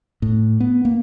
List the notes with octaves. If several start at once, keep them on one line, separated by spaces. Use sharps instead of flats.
A2
B3
A#3